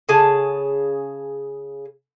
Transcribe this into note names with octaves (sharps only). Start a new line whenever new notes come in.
C#3 G#4 A5